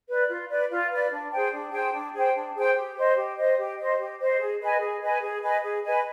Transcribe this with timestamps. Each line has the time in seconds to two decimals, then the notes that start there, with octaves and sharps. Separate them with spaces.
0.08 B4 D5
0.29 F4
0.49 B4 D5
0.70 F4
0.90 B4 D5
1.11 D4
1.32 G#4 C5 G5
1.53 D4
1.72 G#4 C5 G5
1.93 D4
2.14 G#4 C5 G5
2.35 D4
2.55 G#4 C5 G5
2.75 G4
2.96 C5 D#5
3.16 G4
3.37 C5 D#5
3.57 G4
3.78 C5 D#5
3.99 G4
4.20 C5 D#5
4.39 G#4
4.61 B4 D#5 G#5
4.80 G#4
5.02 B4 D#5 G#5
5.22 G#4
5.42 B4 D#5 G#5
5.63 G#4
5.84 B4 D#5 G#5